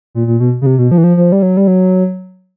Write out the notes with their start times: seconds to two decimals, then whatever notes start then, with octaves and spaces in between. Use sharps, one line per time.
0.15 A#2
0.27 A#2
0.40 B2
0.62 C#3
0.66 C3
0.78 B2
0.91 F3
0.98 E3
1.04 F3
1.17 F3
1.32 G3
1.42 F#3
1.57 G3
1.67 F#3